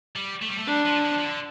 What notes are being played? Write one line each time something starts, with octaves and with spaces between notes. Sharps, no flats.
G3
A3
G3
A3
G3 D4
F3
D3
F3
F3
D3